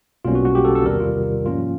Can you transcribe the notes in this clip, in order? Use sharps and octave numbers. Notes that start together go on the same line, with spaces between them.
B1 B2 G3 A#3 C#4 F4
F#4
F#4
G4
A4
A4
E2 C3 D#3 G3 A#4
F4
G#2 F3 A#3 C#4 F4